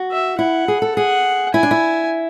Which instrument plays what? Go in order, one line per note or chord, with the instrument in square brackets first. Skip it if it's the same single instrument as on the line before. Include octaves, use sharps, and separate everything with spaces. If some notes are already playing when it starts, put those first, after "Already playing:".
Already playing: [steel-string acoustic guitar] F#4
[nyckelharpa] E5
[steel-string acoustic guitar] E4 [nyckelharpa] F#5
[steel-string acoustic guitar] G#4
A4
[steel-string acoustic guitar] G#4 [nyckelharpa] F#5
[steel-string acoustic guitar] E4 [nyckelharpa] G#5
[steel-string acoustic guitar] D4
E4